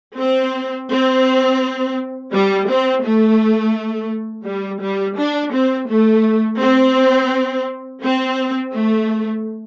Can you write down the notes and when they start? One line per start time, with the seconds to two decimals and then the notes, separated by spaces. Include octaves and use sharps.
0.19 C4
0.91 C4
2.33 G3
2.68 C4
3.04 A3
4.46 G3
4.81 G3
5.17 D4
5.53 C4
5.89 A3
6.60 C4
8.03 C4
8.74 A3